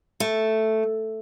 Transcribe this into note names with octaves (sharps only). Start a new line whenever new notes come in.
A3